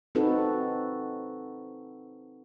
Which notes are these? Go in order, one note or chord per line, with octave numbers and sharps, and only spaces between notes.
C4 D#4 F#4 A4 B4